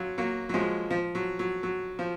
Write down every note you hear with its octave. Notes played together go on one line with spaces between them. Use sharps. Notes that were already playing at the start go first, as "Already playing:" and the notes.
Already playing: F#3 C#4 F4
F#3 A#3
F#3
F3 G#3
F3
F#3
F#3
F#3
F3